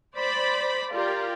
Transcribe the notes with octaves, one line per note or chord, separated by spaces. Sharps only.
C5 D5 B5
F4 G4 A#4 D5